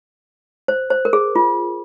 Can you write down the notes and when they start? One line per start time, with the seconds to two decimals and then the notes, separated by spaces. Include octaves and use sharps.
0.68 C5
0.90 C5
1.05 A#4
1.13 G#4
1.36 F4